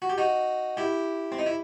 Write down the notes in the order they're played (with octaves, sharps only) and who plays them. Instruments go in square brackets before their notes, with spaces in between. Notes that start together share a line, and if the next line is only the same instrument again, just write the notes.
[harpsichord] F#4
G4
D#4 F#4
E4 G4
C4
D#4
E4